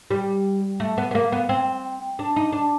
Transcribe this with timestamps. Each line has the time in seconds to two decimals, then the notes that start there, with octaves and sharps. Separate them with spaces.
0.11 G3
0.80 A3
0.98 B3
1.11 B3
1.15 A#3
1.32 B3
1.49 C4
2.19 D4
2.36 D#4
2.52 D4